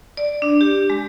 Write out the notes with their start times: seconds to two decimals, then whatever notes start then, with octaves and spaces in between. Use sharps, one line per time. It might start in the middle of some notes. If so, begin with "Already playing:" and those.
0.17 D5
0.42 D4
0.61 G4
0.90 G#3